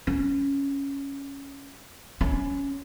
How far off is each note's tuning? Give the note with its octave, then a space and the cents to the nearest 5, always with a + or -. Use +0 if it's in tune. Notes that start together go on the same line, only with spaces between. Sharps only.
C#4 +0
C#4 +10